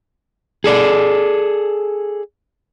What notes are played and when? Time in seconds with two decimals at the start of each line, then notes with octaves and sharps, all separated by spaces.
0.64 G#4 A4 D5